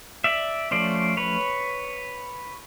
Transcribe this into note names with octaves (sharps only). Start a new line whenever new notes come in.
D5 E5
F3 A3 C#4 C5 D5
B4 C#5